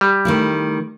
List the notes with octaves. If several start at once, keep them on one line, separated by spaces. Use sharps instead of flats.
G3
D#3 A3 E4